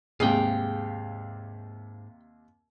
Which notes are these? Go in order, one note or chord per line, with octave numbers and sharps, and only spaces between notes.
D#2 G#2 C3 G#4 F5 G5